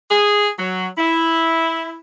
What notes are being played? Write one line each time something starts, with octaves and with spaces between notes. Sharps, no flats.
G#4
F#3
E4